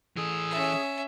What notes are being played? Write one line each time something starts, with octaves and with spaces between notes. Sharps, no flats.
E3 G#4 A4 E6
C#4 E5